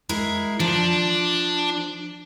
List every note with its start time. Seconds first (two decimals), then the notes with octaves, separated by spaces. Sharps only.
0.09 G#3 E4 A#4
0.60 F3 D4